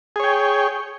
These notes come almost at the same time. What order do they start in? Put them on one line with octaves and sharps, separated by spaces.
G#4 C#5 G5